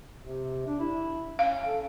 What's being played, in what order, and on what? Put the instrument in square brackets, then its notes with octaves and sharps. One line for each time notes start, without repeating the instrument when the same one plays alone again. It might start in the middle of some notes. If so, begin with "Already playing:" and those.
[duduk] C3
D4
E4
[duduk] C#4 [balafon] F5
[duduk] A4